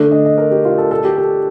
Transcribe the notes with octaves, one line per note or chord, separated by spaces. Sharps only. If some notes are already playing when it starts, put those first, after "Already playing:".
Already playing: D3 A3 D4
D#5
D#5
A#4
G4
F4
A4
A4
G4
A4